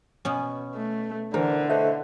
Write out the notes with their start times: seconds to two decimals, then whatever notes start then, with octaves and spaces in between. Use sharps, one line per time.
0.25 B2 B3 C#4
0.75 A3
1.34 D3 E3 A#4 C5 A#5
1.69 A3 B4 C5 D#5